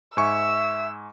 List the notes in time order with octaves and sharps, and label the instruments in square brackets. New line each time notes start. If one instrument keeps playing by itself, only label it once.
[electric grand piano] G#2 G#5 C#6 [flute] E5 [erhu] E6